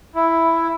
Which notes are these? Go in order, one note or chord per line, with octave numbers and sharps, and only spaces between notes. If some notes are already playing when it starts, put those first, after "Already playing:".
E4